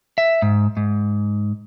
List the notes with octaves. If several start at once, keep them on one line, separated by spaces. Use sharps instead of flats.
E5
G#2
G#2